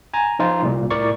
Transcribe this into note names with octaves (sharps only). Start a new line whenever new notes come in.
G#5 A#5
F3 D#4 F4
C2 A#2
A2 A#4 D5 C#6